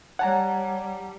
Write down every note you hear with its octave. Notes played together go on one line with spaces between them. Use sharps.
G3 C#5 F#5 A5 A#5